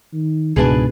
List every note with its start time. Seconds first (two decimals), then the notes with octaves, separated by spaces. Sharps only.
0.13 D#3
0.56 C#2 G#2 B2 D4 G#4 B4 A5